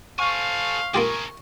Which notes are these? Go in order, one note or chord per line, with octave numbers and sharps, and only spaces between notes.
A4 C5 F5 G#5 C#6
A#3 F4 G4 G#4 A#4